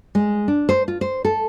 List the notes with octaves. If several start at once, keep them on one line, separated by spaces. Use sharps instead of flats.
G#3
D4
C5
F4
C5
A4